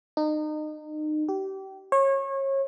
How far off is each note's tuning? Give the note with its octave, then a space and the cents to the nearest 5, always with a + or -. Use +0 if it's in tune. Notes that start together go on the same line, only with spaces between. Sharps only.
D#4 -30
G4 -30
C#5 -30